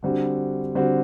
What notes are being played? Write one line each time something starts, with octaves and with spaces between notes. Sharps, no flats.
D3 G3 C4 F#4
D3 G3 C4 F#4